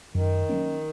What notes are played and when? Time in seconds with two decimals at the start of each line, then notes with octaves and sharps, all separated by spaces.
0.15 F#2 D#3
0.49 F#3 A#3 C#4